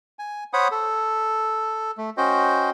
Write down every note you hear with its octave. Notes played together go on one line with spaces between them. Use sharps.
G#5
C5 C#5 F#5 B5 D#6
A4
A3
C#4 F#4 C5 D#5 G5